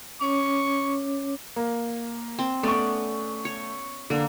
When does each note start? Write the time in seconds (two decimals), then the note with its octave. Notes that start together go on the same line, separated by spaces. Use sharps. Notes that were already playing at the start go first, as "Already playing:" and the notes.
0.21 C#4 C#5 C#6 D6
1.56 A#3
2.39 C4
2.63 A3 B3 C#4 D5 C#6
3.45 C#5
4.10 D3 A#3